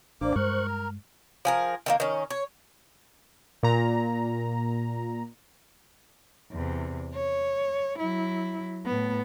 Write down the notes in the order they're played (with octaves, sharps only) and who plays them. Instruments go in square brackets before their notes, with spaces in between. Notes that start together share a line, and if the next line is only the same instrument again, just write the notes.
[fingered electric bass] A1 [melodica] A#3 D6 [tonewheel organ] D4 C5 D5
[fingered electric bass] G2 G#3 [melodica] A#4 [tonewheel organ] C5 C#6 F#6
[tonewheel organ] A#5
[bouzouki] F3 G#4 A#4
D#3 G3 A#3
D#3 C#4
C#5
[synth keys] A#2 A#5
[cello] E2 C3
C#5
F#3 E4
A2 B3